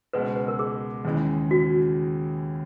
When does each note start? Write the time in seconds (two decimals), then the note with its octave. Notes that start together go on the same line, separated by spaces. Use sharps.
0.13 C#2 B2 G#3 B4
0.25 B4
0.36 B4
0.48 A#4
0.59 G#4
1.05 D#2 C#3 E3 G#3
1.51 F#4